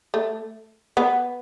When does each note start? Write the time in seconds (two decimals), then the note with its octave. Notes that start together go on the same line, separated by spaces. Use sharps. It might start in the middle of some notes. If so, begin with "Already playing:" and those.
0.14 A3
0.97 B3